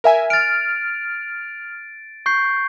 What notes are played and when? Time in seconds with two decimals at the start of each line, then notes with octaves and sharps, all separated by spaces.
0.04 A#4 E5 G#5
0.30 F6 A6 D7
2.26 C#6 G6 C7